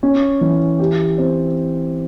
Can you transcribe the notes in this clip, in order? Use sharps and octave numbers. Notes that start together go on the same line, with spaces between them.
C#4
E3
G4
C4